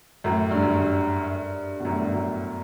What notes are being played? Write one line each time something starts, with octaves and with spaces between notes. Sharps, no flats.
F#2 A2
G2
F#2
G2
B2
F#2 A2
G2
F#2 A2